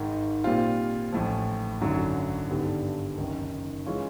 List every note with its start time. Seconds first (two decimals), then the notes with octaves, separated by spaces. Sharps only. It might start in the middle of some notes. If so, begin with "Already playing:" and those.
Already playing: G#1 G#2 D#3
0.44 A#2 G3 C4 F4
1.12 A1 A2 F3
1.81 G#1 F#2 D3 F#3
2.49 G#1 G2 D3 G3 B3
3.18 F#1 F#2 D#3
3.86 E3 G#3 C#4 F4